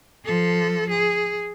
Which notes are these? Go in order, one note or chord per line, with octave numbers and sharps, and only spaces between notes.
F3 A4
G#4